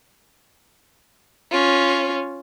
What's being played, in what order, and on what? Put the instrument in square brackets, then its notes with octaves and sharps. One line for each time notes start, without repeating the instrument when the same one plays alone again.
[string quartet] C#4 F4